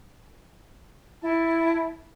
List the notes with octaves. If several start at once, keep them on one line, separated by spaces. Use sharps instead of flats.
E4 A5